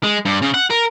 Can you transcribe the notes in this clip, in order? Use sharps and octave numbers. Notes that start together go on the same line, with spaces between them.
G#3
G2
C#3
F#5
A#4